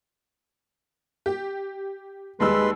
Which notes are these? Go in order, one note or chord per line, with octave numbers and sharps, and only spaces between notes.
G4
D#2 G3 G#3 B4 C6 E6